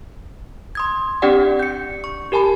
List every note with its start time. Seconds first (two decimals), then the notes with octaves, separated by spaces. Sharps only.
0.75 C6 D#6 G#6
1.22 C4 D4 G4 D5 F#5 G5
1.59 G6 C#7
2.04 C#6
2.32 G4 A#4 G#5 A5 B5